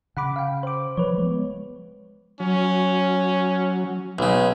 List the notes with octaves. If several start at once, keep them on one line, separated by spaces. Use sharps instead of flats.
C#3 F#5 B5 D6
F5 G5
C5 D6
F3 B4 C#5
G#3 B3
F#3 C#4
B1 C#3